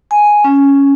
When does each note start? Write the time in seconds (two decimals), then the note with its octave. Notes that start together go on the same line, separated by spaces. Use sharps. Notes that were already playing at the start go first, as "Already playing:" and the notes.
0.11 G#5
0.44 C#4